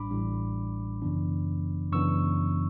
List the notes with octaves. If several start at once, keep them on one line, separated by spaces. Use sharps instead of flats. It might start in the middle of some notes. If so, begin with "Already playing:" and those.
Already playing: A1 A2 G3 D4 B5 D6
A1 A2 G3 D4
F#2 C#3 E3 B3 D4
F#2 C#3 E3 B3 D4 C#6 E6